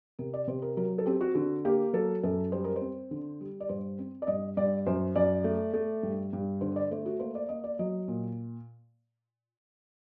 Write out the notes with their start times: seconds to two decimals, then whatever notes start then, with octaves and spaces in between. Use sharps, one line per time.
0.19 C3 A#4
0.34 D5
0.47 C3 C5
0.62 A#4
0.77 F#3 A#4
0.98 A4
1.06 C4 G4
1.21 F#4
1.35 D3 F#4
1.65 A#3 G4
1.93 F#3 A4
2.23 F#2 A4
2.52 G3 C5
2.64 A#4
2.76 C5
2.81 C4
3.11 D3
3.41 G3
3.60 D5
3.69 G2 C5
3.99 C4
4.22 D5
4.27 G2 D#5
4.57 G2 D5
4.86 F#2 C5
5.16 F#2 D5
5.44 A3
5.73 A3
6.03 G2
6.33 G2
6.61 D3 C5
6.76 D5
6.91 A3 C5
7.06 F#4
7.20 A#3 C5
7.35 D5
7.49 A#3 D#5
7.64 D5
7.79 F#3 D#5
8.08 A#2